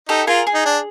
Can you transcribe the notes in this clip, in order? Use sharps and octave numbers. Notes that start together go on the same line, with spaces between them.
D#4 G4 A4
F4 G#4 A#4
G#4
D#4
D4